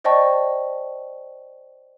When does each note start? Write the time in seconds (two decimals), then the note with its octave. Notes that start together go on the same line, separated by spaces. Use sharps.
0.04 C5 D5 D#5 G5 A5 C#6